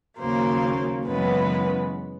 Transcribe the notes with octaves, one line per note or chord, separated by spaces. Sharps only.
D#2 C#3 F#3 A#3 C5
F#2 C#3 E3 G#3 B3 B4